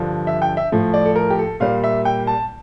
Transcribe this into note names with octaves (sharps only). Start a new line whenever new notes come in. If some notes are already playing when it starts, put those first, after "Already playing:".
Already playing: G2 D3 F3
E5
G5
E5
A2 F3 A3
D5
A4
A#4
G4
A4
A#2 G3 A#3 F5
E5
G5
A5